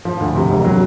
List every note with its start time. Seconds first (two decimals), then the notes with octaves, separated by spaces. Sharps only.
0.05 F3
0.20 D2
0.35 C3
0.51 E1
0.65 F#3